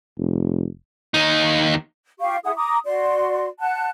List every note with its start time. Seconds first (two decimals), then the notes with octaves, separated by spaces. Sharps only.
0.18 F1
1.14 D#2 D#4
2.20 F4 G4 F5 C#6
2.44 E4 G#4 F#5 D#6
2.56 A#5 D6 D#6
2.85 F#4 D5 C6
3.60 F#5 A5 F#6